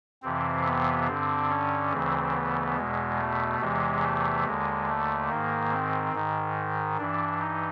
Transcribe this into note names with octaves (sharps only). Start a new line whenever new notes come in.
F2 C3 E3 C4
B3
G2 D3 C4
C#4
D2 C#3 E3 C4
B3
E2 B2 G#3
A3
E2 C3 E3 G#3
A3
D#2 D3 G#3
A3
G#2 D#3 A#3
C4
G#2 D#3
G2 E3 D4
D#4